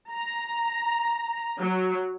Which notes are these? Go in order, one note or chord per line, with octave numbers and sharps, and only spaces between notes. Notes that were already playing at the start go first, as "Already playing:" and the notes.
A#5
F#3